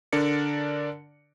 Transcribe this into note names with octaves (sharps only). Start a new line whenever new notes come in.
D3 D4 A#4 D5 C#7